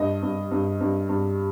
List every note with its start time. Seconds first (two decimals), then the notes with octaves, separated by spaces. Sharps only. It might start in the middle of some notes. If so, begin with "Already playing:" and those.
Already playing: G2 D#5
0.22 G2
0.51 G2
0.80 G2
1.09 G2